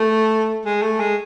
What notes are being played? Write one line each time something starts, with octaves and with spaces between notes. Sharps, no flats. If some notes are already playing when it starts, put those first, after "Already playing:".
Already playing: A3
G#3
A3
G#3